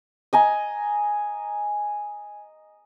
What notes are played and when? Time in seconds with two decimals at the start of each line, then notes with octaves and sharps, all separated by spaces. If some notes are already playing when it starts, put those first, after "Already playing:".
0.33 D#5 G#5 A#5